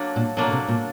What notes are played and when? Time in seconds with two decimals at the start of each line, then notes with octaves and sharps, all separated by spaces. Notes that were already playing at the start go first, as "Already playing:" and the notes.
Already playing: F#3 A#3 D4
0.16 A#2
0.37 B2 F#3 A#3 D4
0.48 C#3
0.52 C3
0.68 A#2